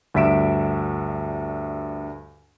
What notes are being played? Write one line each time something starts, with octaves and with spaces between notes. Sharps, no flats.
D2 G2 E5 B6 D7 E7